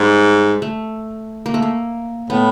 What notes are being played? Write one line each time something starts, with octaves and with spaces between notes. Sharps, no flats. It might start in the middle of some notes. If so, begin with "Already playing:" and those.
Already playing: G#2 G3
A3
A#3
A3
A#3
A2 B3